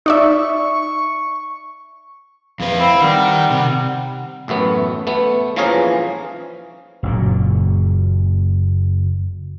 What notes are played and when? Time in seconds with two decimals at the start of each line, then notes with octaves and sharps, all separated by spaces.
0.06 D#4 D5 E5 C#6
2.60 F2 B4 F5
2.79 C4 E4
3.01 D#3 G3 F#5
3.51 C3
4.48 A1 F#2 A3 B3
5.07 A3 B3
5.56 E3 F3 A#3 C#4 G#4 A#4
7.03 F#1 F#2 A#2